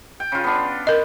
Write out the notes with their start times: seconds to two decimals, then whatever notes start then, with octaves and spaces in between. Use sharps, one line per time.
0.20 G5
0.32 C#3 F4
0.44 B3 D4
0.87 A#4 D#5